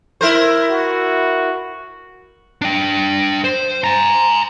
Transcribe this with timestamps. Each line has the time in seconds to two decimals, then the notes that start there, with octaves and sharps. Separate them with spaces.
0.21 E4 A#4 C5
0.70 F#4
2.61 D4 G5
3.44 C5
3.84 G#5 A#5